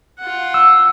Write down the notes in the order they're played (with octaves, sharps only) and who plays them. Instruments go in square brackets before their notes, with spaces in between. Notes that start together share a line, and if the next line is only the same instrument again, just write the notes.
[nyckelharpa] F4 F#5
[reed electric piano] E6